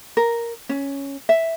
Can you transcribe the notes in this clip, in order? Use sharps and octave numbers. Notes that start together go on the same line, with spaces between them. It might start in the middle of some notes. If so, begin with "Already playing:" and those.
A#4
C#4
E5